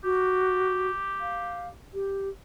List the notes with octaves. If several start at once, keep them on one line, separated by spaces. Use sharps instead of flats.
F#4 G4
F5
G4